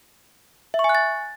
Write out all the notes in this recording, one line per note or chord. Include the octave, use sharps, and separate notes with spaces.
E5
C#6
G#5
F#6
A6